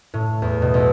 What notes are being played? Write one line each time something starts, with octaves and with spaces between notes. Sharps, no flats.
A2
E2
B2
B1